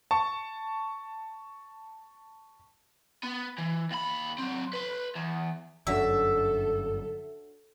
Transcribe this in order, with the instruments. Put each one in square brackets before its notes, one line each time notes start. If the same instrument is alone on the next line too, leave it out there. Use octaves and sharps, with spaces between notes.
[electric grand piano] A5 C#6
[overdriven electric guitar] B3
E3
D#2 B5
F#3 C4
B4 C6
E2
[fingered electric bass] G1 F#2 [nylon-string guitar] D4 F#4 C#5 [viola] A4 [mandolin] E5